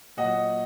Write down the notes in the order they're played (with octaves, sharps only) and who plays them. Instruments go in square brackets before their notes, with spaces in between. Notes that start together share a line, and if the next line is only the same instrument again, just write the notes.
[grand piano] A#2 F#3 D#5 F#5